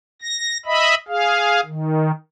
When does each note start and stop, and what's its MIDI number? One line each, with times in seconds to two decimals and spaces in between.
0.22 0.58 94
0.66 0.95 75
0.66 0.95 76
0.66 0.95 83
1.08 1.61 68
1.08 1.61 77
1.65 2.12 51